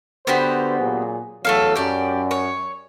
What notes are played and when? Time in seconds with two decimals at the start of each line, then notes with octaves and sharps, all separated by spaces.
0.27 D3 B3 F#4 G4 C5
0.80 A#2 F#3 G#4
1.45 E2 F#3 A3 A4 F5
1.76 F#2 G4 D5
2.31 C#5